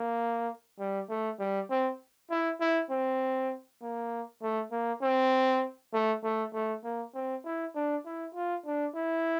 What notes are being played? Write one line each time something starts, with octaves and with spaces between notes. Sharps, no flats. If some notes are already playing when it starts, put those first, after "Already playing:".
Already playing: A#3
G3
A3
G3
C4
E4
E4
C4
A#3
A3
A#3
C4
A3
A3
A3
A#3
C4
E4
D4
E4
F4
D4
E4